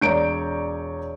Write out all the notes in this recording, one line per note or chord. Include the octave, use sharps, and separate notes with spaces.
E1 C#5 D5 A#5 G6 D7